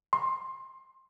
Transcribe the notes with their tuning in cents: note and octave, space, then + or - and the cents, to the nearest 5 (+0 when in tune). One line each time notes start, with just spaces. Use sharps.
C6 +15